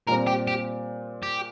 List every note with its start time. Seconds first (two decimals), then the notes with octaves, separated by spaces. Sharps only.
0.08 A#2 G3 C4 A#4
0.27 G4
0.47 G4
1.23 G4